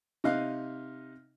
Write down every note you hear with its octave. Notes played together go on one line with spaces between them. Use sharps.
C3 D#4 D#5 F5 F#6